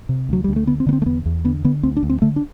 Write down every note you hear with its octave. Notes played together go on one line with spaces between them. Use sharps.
C3
D2 F#3
D2 G3
A3
D3 B3
C4
D3 B3
C4
A3
E2 B3
E2
D3 B3
D3 B3
D2 C4
D4
D2
C4
D3 A3
D4